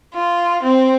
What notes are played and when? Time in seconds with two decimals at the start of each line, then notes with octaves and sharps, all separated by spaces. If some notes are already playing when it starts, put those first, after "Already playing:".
0.15 F4
0.64 C4